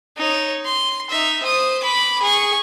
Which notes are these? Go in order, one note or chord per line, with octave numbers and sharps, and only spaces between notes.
D#4 C#5
C6
D#4 E5
C5 D#6
B5 D6
G#4 C#6